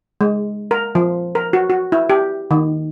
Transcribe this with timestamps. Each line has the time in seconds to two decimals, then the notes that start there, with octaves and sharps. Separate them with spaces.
0.21 G#3
0.71 A#4
0.95 F3
1.35 A#4
1.53 F#4
1.70 F#4
1.92 E4
2.10 G4
2.51 D#3